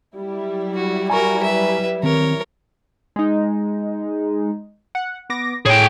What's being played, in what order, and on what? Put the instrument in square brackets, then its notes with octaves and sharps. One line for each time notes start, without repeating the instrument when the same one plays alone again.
[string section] F#3 G3 E4
[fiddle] F#4
[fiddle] F#4 A#4 [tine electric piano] G#5 A#5 C#6
[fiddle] B4 E5
[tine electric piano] D#3 C4 [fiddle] A#4 C#5
[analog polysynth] G#3 D#4
F#5
B3 D6 A#6
[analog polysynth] A2 C#5 [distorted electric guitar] G#4 G5